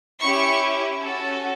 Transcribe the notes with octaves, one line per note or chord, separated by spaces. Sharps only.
C#4 E4 G4 C#6
C#4 F#4 A4